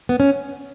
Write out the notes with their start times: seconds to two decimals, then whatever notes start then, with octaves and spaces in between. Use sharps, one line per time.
0.09 B3
0.20 C#4